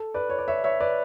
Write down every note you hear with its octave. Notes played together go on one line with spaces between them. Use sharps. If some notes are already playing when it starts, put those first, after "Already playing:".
Already playing: A4
B4 D5
C#5
D5
C#5 E5
C#5 E5
B4 D5